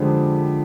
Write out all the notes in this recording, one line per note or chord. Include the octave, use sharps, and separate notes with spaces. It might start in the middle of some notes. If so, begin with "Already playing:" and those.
Already playing: F2 D3 F3 G#3 G4